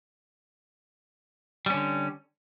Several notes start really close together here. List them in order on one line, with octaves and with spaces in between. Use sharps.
G3 C#4 D3